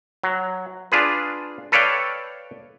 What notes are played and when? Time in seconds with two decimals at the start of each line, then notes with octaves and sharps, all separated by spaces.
0.23 F#3
0.92 D4 F4 G#4 B4
1.72 A4 B4 C#5 D5 F5 G5